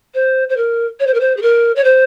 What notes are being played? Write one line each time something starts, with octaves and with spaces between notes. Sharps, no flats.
C5
C5
A#4
C#5
C5
A#4
C5
G#4
A#4
C#5
C5